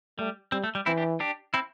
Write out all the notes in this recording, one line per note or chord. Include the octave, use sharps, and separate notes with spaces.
G3 A3
G3 C4
A3
G3
E3 C4 E4
D4 G4
D4 G4
C4 E4